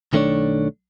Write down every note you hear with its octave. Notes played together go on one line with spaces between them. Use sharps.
B1 D#3 A3 C#4 D4 C#5